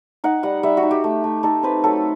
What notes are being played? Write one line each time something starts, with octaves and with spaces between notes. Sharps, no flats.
D#4 F#5
G3 F#5
G3 E5
F#4
D#4
G4
A3
A3
D#4 A4
C4 B4
F#3 A4